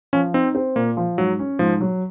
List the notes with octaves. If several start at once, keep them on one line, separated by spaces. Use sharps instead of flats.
F3 C#4
C4 D#4
C4
A#2 A#3
F3
G#2 F#3
C#4
G#2 F3
F#3